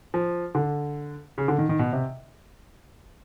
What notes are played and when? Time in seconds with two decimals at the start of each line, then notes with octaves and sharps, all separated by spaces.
0.14 F3
0.55 D3
1.38 C#3
1.48 D3
1.58 D#3
1.69 D#3
1.79 B2
1.93 C3